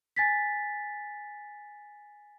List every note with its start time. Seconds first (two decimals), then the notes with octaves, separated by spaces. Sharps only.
0.16 G#5 A6 B6